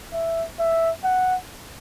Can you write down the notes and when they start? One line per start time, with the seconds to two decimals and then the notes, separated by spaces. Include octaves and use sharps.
0.13 E5
0.59 E5
1.04 F#5